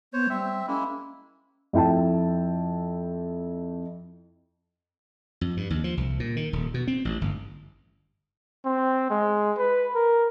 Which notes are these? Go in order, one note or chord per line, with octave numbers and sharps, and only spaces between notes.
B3 C5 C#5
G3 C4 E5
G#3 A#3 C#4 E4
F2 E4 G5 A5
F2
G2
D#2
F3
C2
A#2
D#3
D#1
B2
C4
A1
G1
C4
G#3
B4
A#4